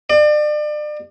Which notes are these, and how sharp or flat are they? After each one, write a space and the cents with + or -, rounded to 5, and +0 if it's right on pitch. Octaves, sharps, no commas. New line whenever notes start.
D5 +35